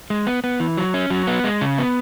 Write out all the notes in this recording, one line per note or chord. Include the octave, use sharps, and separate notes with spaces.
G#3
B3
B3
E3
F#3
C#4
F#3
B3
G#3
C#3
B3